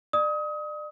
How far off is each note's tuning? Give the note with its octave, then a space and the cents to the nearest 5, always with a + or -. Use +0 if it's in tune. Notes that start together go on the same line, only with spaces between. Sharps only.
D5 +35 D#6 +30